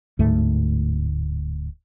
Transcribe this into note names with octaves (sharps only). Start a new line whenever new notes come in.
D1 D2 G#2 A3